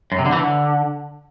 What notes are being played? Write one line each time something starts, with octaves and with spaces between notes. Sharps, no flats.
F#2
C3
D3
E3
D3